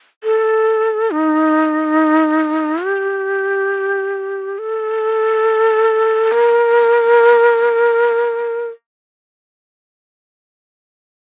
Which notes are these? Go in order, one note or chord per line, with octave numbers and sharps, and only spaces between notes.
A4
D#4
G4
A4
A#4